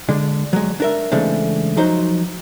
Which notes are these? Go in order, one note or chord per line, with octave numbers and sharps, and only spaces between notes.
D3 G#3 D4
F#3 G#3
D4 A#4 E5
C#3 E3 G#3 A3 C4 D4
F3 F#3 D#4 C5